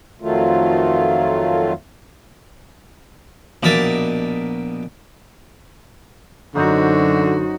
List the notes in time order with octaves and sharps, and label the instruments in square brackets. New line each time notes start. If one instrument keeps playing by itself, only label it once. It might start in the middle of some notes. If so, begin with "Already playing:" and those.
[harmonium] F2 D#3 F#3 A3 F4
[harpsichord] A#1 B2 A#4 E5 A5 D6
[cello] F#2 F#4 [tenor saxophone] D3 [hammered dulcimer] F#3 D#4 C5